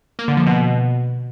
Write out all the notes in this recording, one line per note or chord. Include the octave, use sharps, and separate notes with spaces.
A#3
D3
F3
B2